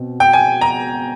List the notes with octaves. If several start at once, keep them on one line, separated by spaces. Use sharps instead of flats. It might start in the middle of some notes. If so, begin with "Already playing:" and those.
Already playing: B2 C4
G5
G#5
A#5